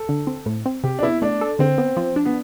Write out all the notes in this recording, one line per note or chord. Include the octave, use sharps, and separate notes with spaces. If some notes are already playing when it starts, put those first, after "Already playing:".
Already playing: A4
D3
C4
A2
C4
C3 G4
D4
B3 E4
A3 D4
A4
D3 C4
B3
F3
D4
B3